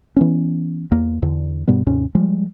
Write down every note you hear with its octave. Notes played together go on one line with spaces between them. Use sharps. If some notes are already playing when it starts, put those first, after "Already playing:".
E3 B3 C#4
E2 A#3
E2 D3
G2 B2 G3 B3
D#2 G#2 C3 C#4
F3 G3 G#3